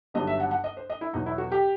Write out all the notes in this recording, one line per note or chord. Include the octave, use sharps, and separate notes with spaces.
G1 G2 D#3 F#3 D#5
E5
F#5
F#5
D#5
C5
D#5
E4
E2 B2 F#3 D#4
E4
F#4
G4